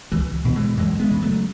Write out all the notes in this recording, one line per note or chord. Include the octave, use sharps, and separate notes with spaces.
C#2 E3
B2
E3 G#3
F#2 E3 G#3
G#3 B3
C#3
F#3 A3